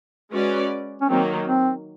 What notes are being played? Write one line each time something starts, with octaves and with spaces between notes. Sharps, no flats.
G#3 C#4 F#4 B4 D5
C#4
D#3 F#3 A#3 C4
C4